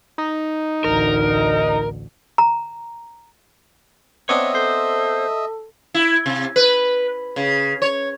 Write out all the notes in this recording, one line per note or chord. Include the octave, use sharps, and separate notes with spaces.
D#4
A1 D2 A#4
A#5
B3 C4 D4 C#5 D#5 E5
A4 C5
E4
C3
B4
C#3
C#5